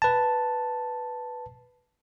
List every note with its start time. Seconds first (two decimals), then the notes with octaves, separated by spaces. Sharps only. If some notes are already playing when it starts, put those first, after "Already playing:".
0.02 B4 A5